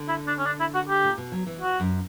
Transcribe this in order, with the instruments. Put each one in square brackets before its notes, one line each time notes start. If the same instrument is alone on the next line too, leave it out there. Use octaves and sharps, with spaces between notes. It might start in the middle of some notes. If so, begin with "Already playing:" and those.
Already playing: [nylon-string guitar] D3
[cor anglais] E4
D4
C#4
D4
E4
F#4
G4
[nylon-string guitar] A#2
B2
F#3
E3
[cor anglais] F#4
[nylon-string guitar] F#2